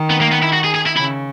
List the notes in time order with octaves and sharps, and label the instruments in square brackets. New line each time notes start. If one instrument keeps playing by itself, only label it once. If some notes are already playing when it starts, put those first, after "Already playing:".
Already playing: [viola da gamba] D#3
[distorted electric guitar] B3
A#3
B3
E4
F#4
G#4
G#4
E4
[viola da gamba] C#3 [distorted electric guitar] E4